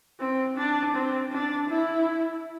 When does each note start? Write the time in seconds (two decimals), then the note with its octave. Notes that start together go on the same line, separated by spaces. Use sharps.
0.20 C4
0.57 D4
0.95 C4
1.33 D4
1.70 E4